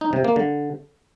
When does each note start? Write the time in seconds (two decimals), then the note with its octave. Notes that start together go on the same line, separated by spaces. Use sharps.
0.01 D#4
0.13 C3
0.24 A#3
0.36 D3